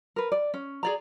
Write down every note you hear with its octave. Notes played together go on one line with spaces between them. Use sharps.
A#4 B4
D5
C#4
G#4 D5 A#5